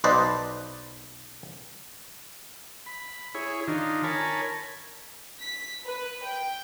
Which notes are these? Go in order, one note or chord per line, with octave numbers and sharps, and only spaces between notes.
B1 B4 C5 D5 D#5 A5
B5
E4 G#4 C#5
D#3 D4 D#4 F4
A#4 C#5 G#5 A5 B5
B6
B4
G5